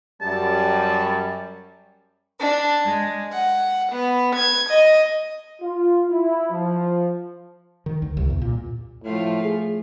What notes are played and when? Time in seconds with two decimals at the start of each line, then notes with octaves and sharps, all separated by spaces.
0.22 F#2 G3 A5
2.40 D4
2.85 G#3
3.32 F#5
3.92 B3
4.35 G#6
4.70 D#5
5.62 F4
6.10 E4
6.50 F3
7.86 D#3
8.02 D2
8.17 C2
8.30 E2
8.42 A#2
9.04 A2 F3 A3 F4
9.43 G#4